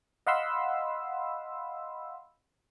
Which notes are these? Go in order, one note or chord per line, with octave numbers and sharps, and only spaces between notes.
D#5 F5 F#5 B5 C6 E6